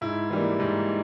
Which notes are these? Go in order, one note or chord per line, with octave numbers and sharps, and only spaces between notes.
G#2 E4
E3 G3 A#3
G#2